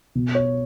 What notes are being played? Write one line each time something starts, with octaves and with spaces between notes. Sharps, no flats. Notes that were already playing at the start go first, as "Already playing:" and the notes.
B2
C#5